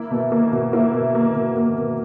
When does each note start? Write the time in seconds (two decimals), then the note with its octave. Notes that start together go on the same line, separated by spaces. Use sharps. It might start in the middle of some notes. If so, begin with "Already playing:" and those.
Already playing: A#3 E4
0.11 B2
0.32 A#3
0.52 B2
0.73 A#3 E4
0.94 B2
1.15 A#3
1.35 B2
1.57 A#3
1.78 B2